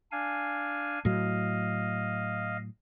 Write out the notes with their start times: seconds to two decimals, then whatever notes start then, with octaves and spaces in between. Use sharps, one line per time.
0.12 D4 F5 G#5
1.05 A2 F#3 D#5 F5